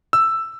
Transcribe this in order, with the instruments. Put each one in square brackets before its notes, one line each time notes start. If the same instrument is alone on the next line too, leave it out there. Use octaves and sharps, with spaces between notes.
[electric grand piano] E6